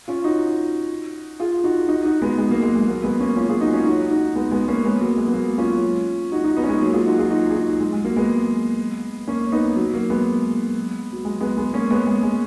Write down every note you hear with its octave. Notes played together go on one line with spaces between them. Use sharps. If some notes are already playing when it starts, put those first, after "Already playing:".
C#4 F4
D#4 F#4
F4 G#4
D#4 F#4
D#4 F#4
D#4 F#4
G#3 B3
G#3
F#3 A#3
G#3
G#3
F#3 A#3
G#3 B3
A#3 C#4
C#4 F4
F4 G#4
D#4 F#4
C#4 F4
D#4 F#4
D#4 F#4
G#3 B3
G#3 B3
A#3 C#4
G#3 B3
F#3 A#3
G#3
B3
F#3 A#3
C#4 F4
D#4 F#4
D#4 F#4
B3 D#4
C#4
G#3 B3
F#3 A#3
F4 G#4
D#4 F#4
F4 G#4
D#4 F#4
G#4
D#4 F#4
G#3
G#3
F#3 A#3
G#3 B3
A#3 C#4
B3 D#4
F#3
F#3 A#3
G#3 B3
F#3
G#3
G#3 B3
G#3 B3
A#3 C#4
G#3 B3
G#3
G#3